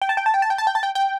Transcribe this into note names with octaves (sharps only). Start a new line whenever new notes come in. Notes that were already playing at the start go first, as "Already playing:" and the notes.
G5
A5
G5
A5
G5
A5
G5
A5
G5
A5
G5
G5